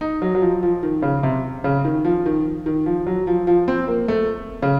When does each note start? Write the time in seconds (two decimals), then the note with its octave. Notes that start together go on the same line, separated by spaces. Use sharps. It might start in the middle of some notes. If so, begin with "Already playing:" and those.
0.01 D#4
0.22 F#3
0.35 F#3
0.42 F3
0.63 F3
0.83 D#3
1.02 C#3
1.23 C3
1.64 C#3
1.85 D#3
2.05 F3
2.26 D#3
2.66 D#3
2.86 F3
3.07 F#3
3.27 F3
3.47 F3
3.68 C4
3.88 A#3
4.08 A3
4.62 C#3